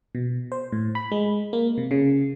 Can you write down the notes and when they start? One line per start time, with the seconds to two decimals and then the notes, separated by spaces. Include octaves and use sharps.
0.15 B2
0.52 C5
0.72 A2
0.95 B5
1.12 G#3
1.53 A#3
1.78 C3
1.91 C#3